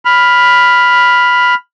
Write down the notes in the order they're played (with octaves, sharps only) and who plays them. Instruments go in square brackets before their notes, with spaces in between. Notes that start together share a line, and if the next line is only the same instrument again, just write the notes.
[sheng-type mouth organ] B5 F6